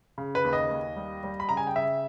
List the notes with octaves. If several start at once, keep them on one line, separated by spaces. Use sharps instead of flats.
C#3
B4
D#2
D#5
D#2
G3
G3
B5
C#3 A#5
G#5
G5
C#3 E5